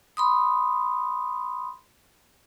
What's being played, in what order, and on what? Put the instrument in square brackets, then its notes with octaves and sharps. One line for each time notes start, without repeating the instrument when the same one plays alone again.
[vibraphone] B5 C6 D#6